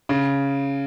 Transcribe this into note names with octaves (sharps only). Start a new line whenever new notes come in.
C#3